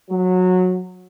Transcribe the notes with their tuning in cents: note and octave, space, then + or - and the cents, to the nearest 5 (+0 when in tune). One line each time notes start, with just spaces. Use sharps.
F#3 -15